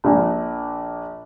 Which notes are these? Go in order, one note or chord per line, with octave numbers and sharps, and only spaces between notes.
A#1 A#2